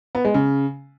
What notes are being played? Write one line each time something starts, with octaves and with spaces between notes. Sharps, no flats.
B3
G#3
C#3